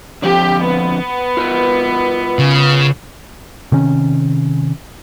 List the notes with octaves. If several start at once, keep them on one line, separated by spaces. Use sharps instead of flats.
D3 F3 C4 G4
B3
F4 A#4 B4
C#3
C3 D#3 C#4